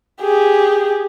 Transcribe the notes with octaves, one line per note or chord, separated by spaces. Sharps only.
G4 G#4